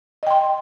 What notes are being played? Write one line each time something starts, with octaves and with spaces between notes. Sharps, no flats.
D#5 G5 C6